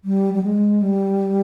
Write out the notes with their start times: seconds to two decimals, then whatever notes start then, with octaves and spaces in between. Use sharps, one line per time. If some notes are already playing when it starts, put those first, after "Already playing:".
0.05 G3
0.34 G3
0.43 G#3
0.82 G3